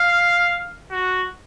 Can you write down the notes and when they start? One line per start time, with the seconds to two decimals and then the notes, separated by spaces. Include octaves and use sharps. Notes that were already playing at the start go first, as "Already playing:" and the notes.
Already playing: F5
0.91 F#4